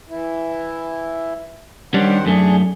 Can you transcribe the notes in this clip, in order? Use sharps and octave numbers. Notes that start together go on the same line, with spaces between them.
E3 E4
D#3 G3 C#4 D4 C5 F#5
F#2 A3 D4 G#4